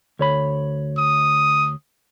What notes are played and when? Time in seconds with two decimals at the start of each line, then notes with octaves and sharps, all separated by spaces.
0.19 D2 C#5 B5
0.98 D#6